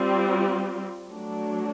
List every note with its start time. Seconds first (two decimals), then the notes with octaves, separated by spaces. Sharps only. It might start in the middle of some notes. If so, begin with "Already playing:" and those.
Already playing: G3 C4 F4
1.08 F#3 A3 D4